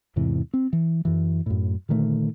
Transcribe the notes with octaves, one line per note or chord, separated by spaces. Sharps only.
E2 G#2 C3 E3
C4
E3
F#2 E3
F#2 A2
A#2 D3 D#3 A3